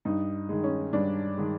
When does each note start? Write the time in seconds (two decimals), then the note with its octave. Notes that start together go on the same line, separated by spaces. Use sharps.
0.05 G2 D#4
0.49 D#3 G#3
0.64 C#4
0.93 G2 D4
1.37 D#3 G#3